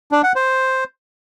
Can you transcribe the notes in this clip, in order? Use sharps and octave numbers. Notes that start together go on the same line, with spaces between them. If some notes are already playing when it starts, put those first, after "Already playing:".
D4
F#5
C5